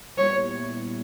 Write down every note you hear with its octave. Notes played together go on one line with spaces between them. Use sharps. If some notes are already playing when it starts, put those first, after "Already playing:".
A#2 G3 B3 E4 C#5